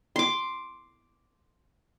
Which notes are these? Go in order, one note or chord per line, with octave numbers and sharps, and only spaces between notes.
C6 D6